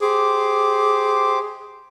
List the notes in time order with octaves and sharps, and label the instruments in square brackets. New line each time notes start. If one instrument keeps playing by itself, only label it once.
[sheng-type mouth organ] G4 C5 D6 [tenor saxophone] G#4